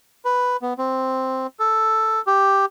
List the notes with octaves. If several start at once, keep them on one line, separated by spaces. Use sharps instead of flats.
B4
B3
C4
A4
G4